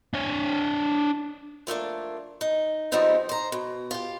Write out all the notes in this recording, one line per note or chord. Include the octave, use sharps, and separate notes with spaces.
D4 C#5
F3 A3 A#3 D4
D#4
F3 G3 G#3 B3 C4 D#4
C5 A#5
B2
F4 G4